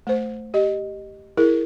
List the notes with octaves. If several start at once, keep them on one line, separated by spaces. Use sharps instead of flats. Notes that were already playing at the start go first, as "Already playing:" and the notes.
A3 C5
G4 D#5
E4 G#4 A#4